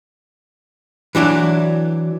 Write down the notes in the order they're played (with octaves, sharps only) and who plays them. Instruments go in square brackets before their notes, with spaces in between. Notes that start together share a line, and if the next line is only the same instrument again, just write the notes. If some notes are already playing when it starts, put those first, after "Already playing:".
[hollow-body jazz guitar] E3 F#3 D4 E4